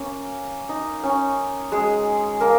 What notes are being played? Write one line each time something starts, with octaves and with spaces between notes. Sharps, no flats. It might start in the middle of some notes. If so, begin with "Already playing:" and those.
Already playing: A#3 C#4
D#4
C#4
G#3 G#4
A#3 A#4